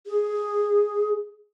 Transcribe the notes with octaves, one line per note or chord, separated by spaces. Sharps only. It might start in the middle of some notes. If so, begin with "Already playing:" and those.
G#4